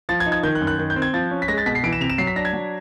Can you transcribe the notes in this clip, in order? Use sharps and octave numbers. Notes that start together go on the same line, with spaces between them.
F3 A6
G#6
D#4
G#6
D#3 G6
F#6
F#2
F#6
D#3
G6
C4
G#6
F3 A6
C#4
B6
G#3 A#6
A6
B2 B6
C7
E3 D7
E7
C3 F7
E7
F#3 C7
B6
D4 A#6
G#6
F#3